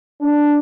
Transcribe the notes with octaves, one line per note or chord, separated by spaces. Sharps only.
D4